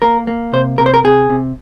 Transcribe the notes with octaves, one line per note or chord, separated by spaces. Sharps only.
A#3 A#4
A#3
C3 C5
C3 A#4
C5
A#4
C3 G#4
C3